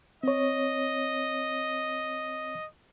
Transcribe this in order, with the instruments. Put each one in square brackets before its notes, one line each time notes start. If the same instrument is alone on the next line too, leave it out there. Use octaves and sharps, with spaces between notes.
[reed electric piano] C4 C#5 [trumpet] D#5